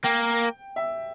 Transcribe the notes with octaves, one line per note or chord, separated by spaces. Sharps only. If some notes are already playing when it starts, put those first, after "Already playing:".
A#3 G5
E5